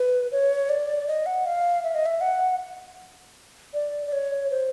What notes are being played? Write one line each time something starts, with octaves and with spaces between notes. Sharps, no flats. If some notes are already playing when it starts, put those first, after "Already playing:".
Already playing: B4
C#5
D5
D#5
F#5
F5
E5
D#5
E5
F#5
D5
D5
C#5
C5